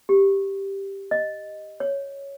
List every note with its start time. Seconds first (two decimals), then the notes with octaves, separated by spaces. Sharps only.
0.09 G4
1.11 D#5
1.80 C#5